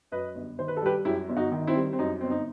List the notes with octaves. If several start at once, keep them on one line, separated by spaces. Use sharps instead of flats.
F#2 B4 D#5
G1
D#3 C5
B4
A4
G3 G4 B4
F#2 E4 G4
G1
D#4 F#4
D#3
C4 E4
G3
C4
F#2 D#4
G1 C4
D#4